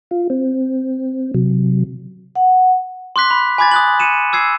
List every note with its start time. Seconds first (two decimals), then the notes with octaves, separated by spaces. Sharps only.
0.11 F4
0.30 C4
1.34 C3 F#3
2.35 F#5
3.16 C6 D6 F#6 B6
3.31 B5
3.58 G#5 B5 D6 G#6 A6
3.71 D#6 F#6 F#7
4.00 C#7 D#7 E7
4.33 D6 E6 G#6 C7